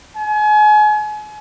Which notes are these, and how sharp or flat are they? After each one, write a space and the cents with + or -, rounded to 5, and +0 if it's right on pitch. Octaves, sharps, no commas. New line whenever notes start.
G#5 +35